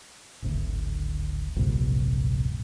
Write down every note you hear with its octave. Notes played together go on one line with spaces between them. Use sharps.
D1 G#1 D2
D1 A#1 G2 C3